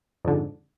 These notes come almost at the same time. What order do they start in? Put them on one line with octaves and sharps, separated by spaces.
F2 D3 G#2